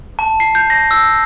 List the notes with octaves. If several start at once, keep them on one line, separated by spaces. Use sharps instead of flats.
A5
C7
G6
A#6
E6